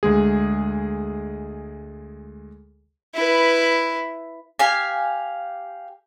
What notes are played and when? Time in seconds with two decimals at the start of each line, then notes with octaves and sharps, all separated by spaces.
0.03 D2 G#3 G#4
3.15 E4 B4
4.59 G4 F5 G#5